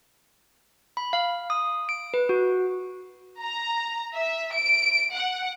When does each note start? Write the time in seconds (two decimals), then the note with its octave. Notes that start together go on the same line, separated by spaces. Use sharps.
0.97 B5
1.13 F5
1.50 D#6
1.89 D7
2.14 B4
2.29 F#4
3.41 A#5
4.15 E5
4.55 D7
5.15 F#5